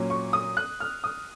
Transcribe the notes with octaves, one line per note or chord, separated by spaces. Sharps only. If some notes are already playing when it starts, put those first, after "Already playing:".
Already playing: A#2 F#3 C#4
C#6
D#6
F#6
F6
D#6